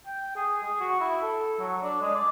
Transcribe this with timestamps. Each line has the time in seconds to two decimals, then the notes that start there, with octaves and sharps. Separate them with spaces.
0.06 G5
0.35 G#4
0.63 G#4
0.80 F#4
1.00 E4
1.22 A4
1.59 F#3
1.83 D4
2.01 G#3
2.14 D5